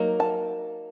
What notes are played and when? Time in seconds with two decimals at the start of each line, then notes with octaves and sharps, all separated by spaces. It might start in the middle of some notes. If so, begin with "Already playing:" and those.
Already playing: F#3 A#3 D#4
0.20 A5